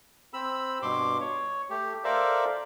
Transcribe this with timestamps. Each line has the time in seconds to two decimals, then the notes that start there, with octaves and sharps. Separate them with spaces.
0.34 C4 B5 E6
0.82 G2 B2 C6 D6
1.20 C#5
1.70 A3 G4
2.04 A4 A#4 C5 D5 E5 F5